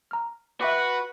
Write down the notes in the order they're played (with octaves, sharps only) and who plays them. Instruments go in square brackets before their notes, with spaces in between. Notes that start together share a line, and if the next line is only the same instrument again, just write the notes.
[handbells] A#5 F6
[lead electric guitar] F#4 [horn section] B4 [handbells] E5 G5 D6